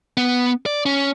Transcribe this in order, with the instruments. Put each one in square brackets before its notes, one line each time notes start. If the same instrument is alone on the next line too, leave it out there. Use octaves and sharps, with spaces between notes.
[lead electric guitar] B3
D5
C#4